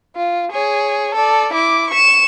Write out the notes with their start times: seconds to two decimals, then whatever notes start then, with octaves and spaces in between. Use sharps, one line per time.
0.16 F4
0.51 G#4 C#5
1.15 A4 D5
1.53 E4 D6
1.90 C#6 E7